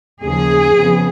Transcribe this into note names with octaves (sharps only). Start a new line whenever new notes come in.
D#2 C#3 F3 G#4
F2 C#3 F3 B3